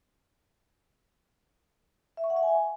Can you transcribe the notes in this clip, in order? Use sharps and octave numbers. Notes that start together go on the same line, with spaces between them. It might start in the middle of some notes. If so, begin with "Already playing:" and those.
E5
C#6
F#5
E5
G#5